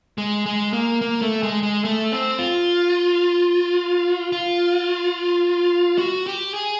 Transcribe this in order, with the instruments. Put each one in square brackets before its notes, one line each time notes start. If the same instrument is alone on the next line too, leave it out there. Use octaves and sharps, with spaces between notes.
[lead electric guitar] G#3
G#3
A#3
A#3
A3
G#3
G#3
A3
C4
F4
F4
F#4
G4
G#4